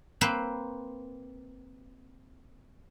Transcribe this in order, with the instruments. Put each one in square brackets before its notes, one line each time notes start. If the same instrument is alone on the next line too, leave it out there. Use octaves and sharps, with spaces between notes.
[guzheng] A#3 C4 B4 C5